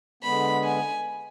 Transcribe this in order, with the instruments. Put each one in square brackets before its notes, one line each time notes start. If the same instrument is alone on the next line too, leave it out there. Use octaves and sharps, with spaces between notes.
[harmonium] D3 G#3 B3 [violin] B5
[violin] G#5